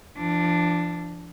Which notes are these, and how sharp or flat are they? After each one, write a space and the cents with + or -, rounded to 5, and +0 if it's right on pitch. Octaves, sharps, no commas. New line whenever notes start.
F3 -35 D4 +0